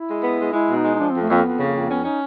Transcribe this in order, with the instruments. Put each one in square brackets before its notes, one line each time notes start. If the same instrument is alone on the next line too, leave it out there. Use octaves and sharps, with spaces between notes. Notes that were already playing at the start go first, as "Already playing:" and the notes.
Already playing: [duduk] E4
[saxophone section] G#3
B3
G#3
[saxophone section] G#3 [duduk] E4
[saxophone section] B2
[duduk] D#4
[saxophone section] G#3
[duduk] D#4
[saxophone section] F3 [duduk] D4
[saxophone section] F2 [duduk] C4
[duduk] A3
[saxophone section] F2 [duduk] A#3
[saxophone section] F2 [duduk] B3
[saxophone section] C#3
[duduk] A#3
[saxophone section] F2
[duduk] B3 [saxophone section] C#4
[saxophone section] C#4 [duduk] D#4